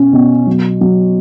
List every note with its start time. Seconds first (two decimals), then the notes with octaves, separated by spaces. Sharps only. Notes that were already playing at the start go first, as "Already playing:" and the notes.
Already playing: B2 C#4
0.13 B2
0.47 F#3
0.81 F#3